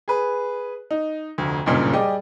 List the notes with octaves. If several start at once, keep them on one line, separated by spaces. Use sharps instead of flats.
G#4 B4
D#4
F1 D2
F#1 B1 G2 A#2 C#3
G3 G4 G#4 D5 D#5